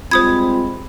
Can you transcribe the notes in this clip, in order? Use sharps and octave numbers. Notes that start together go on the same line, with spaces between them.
G3 G#3 C4 F4 C5 B5 D#6 G#6